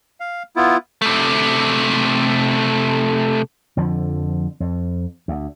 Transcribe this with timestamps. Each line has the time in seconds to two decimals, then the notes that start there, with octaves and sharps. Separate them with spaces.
0.20 F5
0.56 B3 E4 F4
1.02 C3 A3
3.77 F2 D3 F3
4.60 F2
5.28 D2